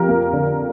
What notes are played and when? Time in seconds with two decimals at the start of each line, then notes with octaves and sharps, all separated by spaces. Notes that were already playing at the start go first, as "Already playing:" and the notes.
Already playing: F2 F3 G4 A#4
0.08 A#3
0.33 D3